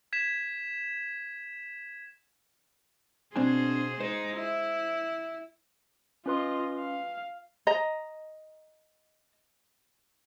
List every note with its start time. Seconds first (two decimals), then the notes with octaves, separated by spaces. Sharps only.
0.13 G#6 B6 E7
3.36 B2 C4 D4 G#4 C5 G#5
4.00 G#3 D#4 C5
4.36 E4
6.26 C#4 F4 B4 D#5 C6
6.79 F5
7.67 D#5 A#5